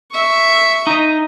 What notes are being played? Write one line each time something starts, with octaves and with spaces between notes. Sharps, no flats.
E5 C#6
D#4 D#5